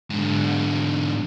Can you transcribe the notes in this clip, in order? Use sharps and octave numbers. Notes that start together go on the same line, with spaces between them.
G#2 D3